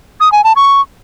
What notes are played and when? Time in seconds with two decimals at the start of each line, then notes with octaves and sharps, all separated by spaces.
0.20 D#6
0.32 G#5
0.44 A5
0.56 C#6